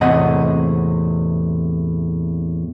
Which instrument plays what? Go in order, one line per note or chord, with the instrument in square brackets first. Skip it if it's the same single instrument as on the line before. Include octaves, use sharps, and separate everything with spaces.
[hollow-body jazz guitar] E2 A2 C3 D#5 F#5